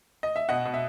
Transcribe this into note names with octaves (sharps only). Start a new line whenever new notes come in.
D#5
E5
B2 D#5 F#5
B2
E5